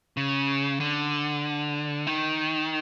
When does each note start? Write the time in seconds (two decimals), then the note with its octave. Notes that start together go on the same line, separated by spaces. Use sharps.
0.17 C#3
0.80 D3
2.07 D#3